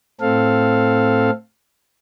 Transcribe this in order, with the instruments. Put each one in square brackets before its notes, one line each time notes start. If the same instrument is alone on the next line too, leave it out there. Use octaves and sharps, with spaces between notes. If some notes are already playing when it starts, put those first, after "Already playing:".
[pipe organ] A2 C4 A4 F5